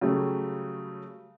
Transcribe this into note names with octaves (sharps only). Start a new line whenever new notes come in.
C#3 F#3 G3 A3